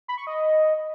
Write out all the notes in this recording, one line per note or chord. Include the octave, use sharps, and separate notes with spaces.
B5
C#6
D#5